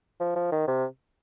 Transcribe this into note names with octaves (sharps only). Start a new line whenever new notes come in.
F3
F3
D#3
C3